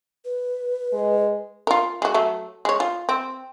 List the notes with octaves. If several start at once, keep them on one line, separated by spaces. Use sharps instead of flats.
B4
G#3
F4 A#4
G#3 F#4
F#3 A3
G#3 C#5
F4
C4